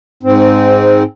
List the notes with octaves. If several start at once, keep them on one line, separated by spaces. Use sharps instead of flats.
G#2 C4